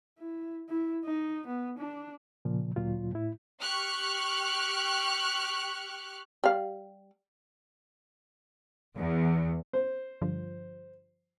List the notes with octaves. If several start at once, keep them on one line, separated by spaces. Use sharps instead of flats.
E4
E4
D#4
B3
D4
A#2 C#3 F3
D2 A#2 F#3 F4
A2 E4
G4 C#6 F6 F#6
G3 F5
E2
C5
G2 D3 F3